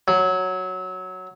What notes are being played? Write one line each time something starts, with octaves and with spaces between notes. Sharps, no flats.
F#3